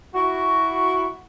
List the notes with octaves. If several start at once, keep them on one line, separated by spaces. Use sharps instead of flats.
E4 F#4